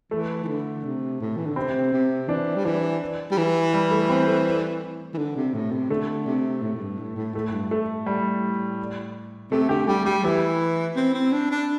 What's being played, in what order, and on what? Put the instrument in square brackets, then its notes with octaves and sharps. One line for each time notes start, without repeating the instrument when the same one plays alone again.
[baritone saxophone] E3 [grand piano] A3
[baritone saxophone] E3
D3
C3
A2
E3
D3
[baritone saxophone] C3 [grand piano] C4
[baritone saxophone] C3
[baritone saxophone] E3 [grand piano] D4
[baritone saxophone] G3
[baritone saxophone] E3 [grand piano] D4
[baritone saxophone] G3
E3
[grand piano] G3
A3
C4
A3
[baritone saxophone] E3
D3
C3
A2
C3
[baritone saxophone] D3 [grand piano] A3
[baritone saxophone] C3
A2
A2
G2
A2
A2
[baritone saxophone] A2 [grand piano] A3
[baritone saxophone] G2
[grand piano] A3
[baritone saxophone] A2
[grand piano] G3
[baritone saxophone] C3 [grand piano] A3
[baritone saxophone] D3 [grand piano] G4
[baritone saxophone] G3 [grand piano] G4
[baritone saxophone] G3 [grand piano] G4
[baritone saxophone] E3 [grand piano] E4
[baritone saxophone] C4
C4
D4
D4